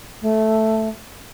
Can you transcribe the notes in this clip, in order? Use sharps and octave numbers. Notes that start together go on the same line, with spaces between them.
A3